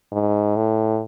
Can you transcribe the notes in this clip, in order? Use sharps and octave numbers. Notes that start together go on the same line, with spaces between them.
G#2
A2